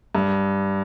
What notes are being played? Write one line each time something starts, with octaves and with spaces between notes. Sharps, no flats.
G2